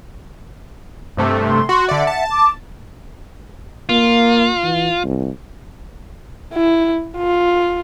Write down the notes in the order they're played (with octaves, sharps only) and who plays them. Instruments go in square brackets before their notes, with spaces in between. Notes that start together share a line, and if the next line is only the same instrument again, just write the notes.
[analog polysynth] G2 C3 A3
[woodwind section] C6
[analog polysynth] F#4
[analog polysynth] D3 D5 [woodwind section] E5 F#5
[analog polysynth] A5
[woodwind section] D6
[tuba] A#3 [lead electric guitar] F4
[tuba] E3
C2
[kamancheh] E4
F4